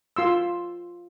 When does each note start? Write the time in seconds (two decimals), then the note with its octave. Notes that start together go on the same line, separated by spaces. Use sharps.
0.16 F4 C6 E6